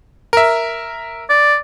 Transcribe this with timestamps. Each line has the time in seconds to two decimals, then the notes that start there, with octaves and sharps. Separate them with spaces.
0.33 A#4 E5
1.29 D5